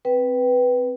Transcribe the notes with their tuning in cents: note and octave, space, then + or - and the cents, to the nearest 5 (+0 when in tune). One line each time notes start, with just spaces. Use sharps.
C4 +0 B4 +0 G5 -10